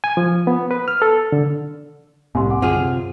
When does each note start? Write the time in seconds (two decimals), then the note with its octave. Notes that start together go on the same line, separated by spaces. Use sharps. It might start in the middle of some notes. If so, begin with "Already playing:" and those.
0.04 G#5
0.17 F3
0.47 B3
0.71 B4
0.88 F6
1.02 A4
1.32 D3
2.35 C2 A2 G#5 C6
2.50 F#5 D6
2.62 F#2 D3 C4 F4 G#4 F#5
2.75 F#2 C3